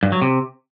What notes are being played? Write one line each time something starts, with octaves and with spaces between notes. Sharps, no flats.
G2
F#3
C3